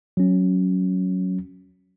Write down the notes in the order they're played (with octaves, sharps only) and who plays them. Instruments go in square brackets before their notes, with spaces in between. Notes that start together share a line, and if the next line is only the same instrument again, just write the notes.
[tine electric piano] F#3 C#4